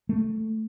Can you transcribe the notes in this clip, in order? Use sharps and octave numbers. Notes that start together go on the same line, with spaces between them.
A3